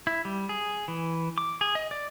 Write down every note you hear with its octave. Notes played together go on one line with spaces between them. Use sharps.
E4
G3
G#4
E3
D6
G#4
D#5
D5